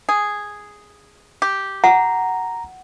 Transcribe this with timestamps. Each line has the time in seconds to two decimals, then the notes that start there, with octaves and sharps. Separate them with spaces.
0.09 G#4
1.42 G4
1.84 F#5 A#5